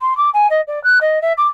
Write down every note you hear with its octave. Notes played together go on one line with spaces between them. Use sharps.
C6
D6
G#5
D#5
D5
F#6
D#5
E5
D6